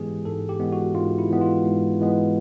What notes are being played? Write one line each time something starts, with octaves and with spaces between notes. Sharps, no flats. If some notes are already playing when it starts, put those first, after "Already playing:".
Already playing: G#2 E3 G#3 B3 G4 G#4
G#2 A4
G4
E3 G#3 B3
F#4
G#2 F4
E4
E3 G#3 B3
F4
G#2
E3 G#3 B3